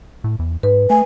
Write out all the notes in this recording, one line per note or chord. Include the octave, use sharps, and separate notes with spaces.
A2
E2
G#2 B4
A3 G#5